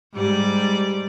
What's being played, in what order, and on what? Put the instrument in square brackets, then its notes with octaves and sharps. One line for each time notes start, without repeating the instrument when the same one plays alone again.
[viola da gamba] G#2 G3 D5